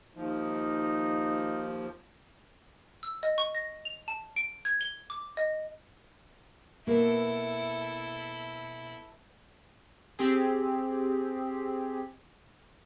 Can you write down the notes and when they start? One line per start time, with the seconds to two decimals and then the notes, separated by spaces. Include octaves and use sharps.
0.16 D#2 F3 D#4
3.03 E6
3.23 D#5
3.38 C#6
3.55 A#6
3.85 F7
4.08 A5
4.36 D7
4.65 G#6
4.81 G7
5.10 D6
5.37 D#5
6.87 B2 A#3 E4 A4
10.19 C4 G4 G#4